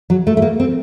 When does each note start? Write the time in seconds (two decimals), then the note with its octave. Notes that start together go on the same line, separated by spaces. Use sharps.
0.10 F#3
0.27 A3
0.37 A3
0.42 A#3
0.60 C4